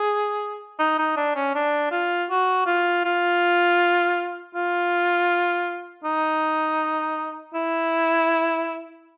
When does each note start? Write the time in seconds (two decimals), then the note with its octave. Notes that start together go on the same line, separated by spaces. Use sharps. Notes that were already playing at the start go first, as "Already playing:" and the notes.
Already playing: G#4
0.79 D#4
0.98 D#4
1.17 D4
1.36 C#4
1.55 D4
1.92 F4
2.30 F#4
2.67 F4
3.05 F4
4.55 F4
6.04 D#4
7.54 E4